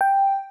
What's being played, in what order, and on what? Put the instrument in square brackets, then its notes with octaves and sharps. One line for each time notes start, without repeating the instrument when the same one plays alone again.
[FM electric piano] G5